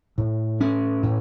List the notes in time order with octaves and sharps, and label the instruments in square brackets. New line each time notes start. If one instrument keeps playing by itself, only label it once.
[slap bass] A2
C#4
A2